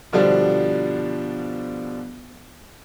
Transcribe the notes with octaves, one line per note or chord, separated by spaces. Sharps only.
B2 D3 F3 G3 D4